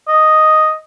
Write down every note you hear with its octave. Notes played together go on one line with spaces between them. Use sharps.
D#5